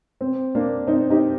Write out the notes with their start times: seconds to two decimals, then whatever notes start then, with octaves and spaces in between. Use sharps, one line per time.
0.21 C4
0.55 A#3 D4
0.87 C4 D#4
1.10 D#4 G4